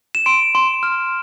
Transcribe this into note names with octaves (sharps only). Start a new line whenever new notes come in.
E7
C6 D7
C6
F6